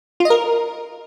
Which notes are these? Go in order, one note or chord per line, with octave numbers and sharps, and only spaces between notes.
F4
D#5
A#4